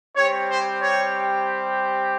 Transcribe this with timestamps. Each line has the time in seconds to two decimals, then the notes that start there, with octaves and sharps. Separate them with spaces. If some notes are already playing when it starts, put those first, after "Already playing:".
0.16 G3 C4 G4 C#5
0.49 C5
0.81 C#5